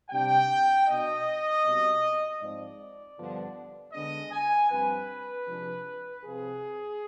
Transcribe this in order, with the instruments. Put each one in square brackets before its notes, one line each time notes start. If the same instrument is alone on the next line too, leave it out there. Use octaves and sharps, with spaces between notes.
[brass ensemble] C3 G3 D4 G5
B2 B3 D4 D#5
B2 G3 C4
G#2 F3 C4 D5
G2 D3 F3 B3 D4
D3 G#3 B3 D4 D#5
G#5
G2 F3 C4 B4
C3 F3 G#3 D4
C3 F3 C4 G#4